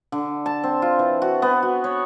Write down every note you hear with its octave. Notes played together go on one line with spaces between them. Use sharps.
D3
A5
C4
F4
E3
F#4
B3
F#4
C#5